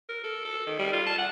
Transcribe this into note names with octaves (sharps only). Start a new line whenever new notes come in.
A#4
A4
A4
D#3
G3
F4
A5
F#5